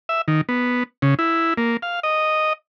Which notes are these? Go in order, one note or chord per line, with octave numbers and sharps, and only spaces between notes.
E5
D#3
B3
C#3
E4
A#3
F5
D#5